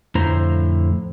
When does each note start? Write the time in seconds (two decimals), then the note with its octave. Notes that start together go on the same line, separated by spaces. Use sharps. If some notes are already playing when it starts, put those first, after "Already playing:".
0.15 F2 A2 D3 E4 C5 A#5